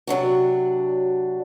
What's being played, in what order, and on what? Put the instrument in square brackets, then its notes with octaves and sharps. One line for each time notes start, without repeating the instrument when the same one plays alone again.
[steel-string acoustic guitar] C3 F#3 D4 F#4